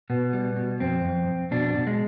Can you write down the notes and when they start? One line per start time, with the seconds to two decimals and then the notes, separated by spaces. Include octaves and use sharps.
0.10 B2 B3
0.33 G3
0.56 B2
0.80 F2 C4
1.05 F2
1.28 F2
1.51 B2 D4
1.75 B2
1.87 G#3